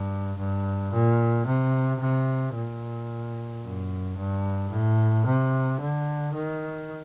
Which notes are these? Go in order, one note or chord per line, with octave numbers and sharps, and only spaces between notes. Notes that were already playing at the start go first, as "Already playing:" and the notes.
Already playing: G2
G2
A#2
C3
C3
A#2
F#2
G2
A2
C3
D3
D#3